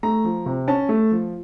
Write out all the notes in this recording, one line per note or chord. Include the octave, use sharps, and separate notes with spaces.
A3 A#5
F3
C3
C#4 A5
A3
F3